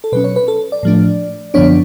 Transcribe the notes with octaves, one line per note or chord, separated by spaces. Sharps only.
A4
B2 F#3 C#4 B4
C#5
B4
A4
D5
A2 F3 A3 D4
F#2 D3 F3 B3 D4 C#5